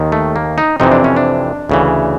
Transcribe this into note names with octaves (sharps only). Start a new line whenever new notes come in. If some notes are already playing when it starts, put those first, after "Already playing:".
Already playing: D#2 D#3
A3
A#3
D#4
F2 C3 E3 D#4
D4
C#4
D4
D2 C#3 E3